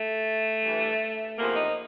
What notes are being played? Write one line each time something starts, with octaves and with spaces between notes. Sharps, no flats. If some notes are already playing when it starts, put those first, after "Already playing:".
Already playing: A3
G2 E3
E2 C3 F3 A#3
D#4